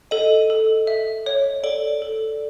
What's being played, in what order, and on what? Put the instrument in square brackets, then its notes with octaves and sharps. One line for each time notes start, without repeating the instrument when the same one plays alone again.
[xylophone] A4 [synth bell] D#5
[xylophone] A4
E5
C#5
[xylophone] A4 [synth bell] D5
[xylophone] A4